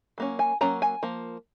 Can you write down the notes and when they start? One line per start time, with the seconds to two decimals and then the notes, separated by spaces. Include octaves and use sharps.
0.18 F#3 A#3 C#4
0.39 G#5
0.61 F#3 A#3 C#4 A#5
0.82 G#5
1.03 F3 A#3